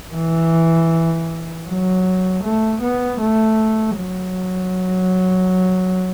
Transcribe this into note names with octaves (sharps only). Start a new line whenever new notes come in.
E3
F#3
A3
B3
A3
F#3